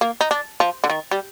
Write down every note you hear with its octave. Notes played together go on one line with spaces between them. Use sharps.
A#3
D#4
D4
F3
D3
D#3
G3